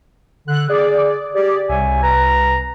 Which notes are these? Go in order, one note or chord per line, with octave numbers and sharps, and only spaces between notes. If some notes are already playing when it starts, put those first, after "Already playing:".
D3 F#6
G#4 D5
G4 G#4 D5
C2 C#5 E5 G#5
B4 A#5